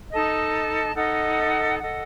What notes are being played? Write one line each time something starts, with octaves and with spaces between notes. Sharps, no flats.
D#4 A4 D#5 A5
D#4 A4 D#5 F#5
A4 D#5 F#5